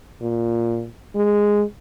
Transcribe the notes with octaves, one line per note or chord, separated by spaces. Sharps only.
A#2
G#3